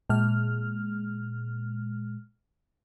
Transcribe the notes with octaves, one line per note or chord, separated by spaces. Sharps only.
A#2 G#3 F6